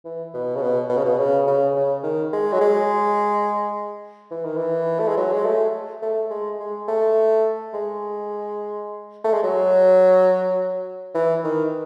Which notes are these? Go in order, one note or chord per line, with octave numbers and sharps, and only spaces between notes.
E3
B2
C#3
B2
B2
C#3
B2
C#3
C#3
C#3
D#3
G#3
F#3
G#3
E3
D#3
E3
A3
G#3
F#3
G#3
A3
A3
G#3
G#3
A3
G#3
A3
G#3
F#3
E3
D#3